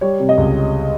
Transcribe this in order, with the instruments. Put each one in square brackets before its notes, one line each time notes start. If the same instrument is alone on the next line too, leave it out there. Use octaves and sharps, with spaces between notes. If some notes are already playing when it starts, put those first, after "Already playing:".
[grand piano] G3 C#5
C3
D#5
C#2